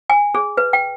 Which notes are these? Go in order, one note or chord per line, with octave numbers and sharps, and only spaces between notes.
G#5
G#4
B4
G5